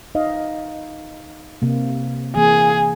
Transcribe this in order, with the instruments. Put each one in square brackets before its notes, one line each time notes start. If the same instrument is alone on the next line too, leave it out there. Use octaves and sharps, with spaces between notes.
[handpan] D#4 D#5 F5
C3 A#3
[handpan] E3 A#3 [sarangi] G#4